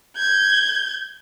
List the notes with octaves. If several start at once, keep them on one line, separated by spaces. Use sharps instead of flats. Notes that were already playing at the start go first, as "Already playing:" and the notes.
G6 G#6